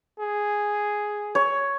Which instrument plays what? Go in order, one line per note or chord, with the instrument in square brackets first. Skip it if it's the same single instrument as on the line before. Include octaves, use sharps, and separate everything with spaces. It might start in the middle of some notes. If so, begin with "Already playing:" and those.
[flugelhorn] G#4
[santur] C#5